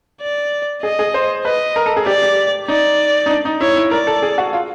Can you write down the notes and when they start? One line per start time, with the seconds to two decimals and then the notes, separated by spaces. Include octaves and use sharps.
0.22 D5
0.83 G#4 D#5
0.99 G#4
1.14 C5
1.45 B4 D#5
1.76 A#4
1.86 A4
1.97 G#4
2.06 G4 D5
2.22 G4
2.68 D#4 D5
3.26 D#4
3.30 D4
3.45 D#4
3.61 E4 C#5
3.76 E4
3.91 A#4 D5
4.07 A4
4.22 G#4
4.38 F#4
4.53 F4